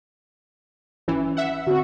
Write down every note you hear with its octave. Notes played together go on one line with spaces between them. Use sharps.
G1 E3 C#4
E5 F#5
D3 C4 F#4